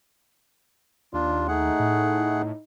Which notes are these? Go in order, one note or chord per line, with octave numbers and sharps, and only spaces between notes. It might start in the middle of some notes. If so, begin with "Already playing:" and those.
D#2 D4 F4
A3 D#4 G#4 F#5
A2